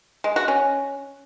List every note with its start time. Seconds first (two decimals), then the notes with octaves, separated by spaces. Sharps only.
0.24 G#3
0.36 F#4
0.48 C#4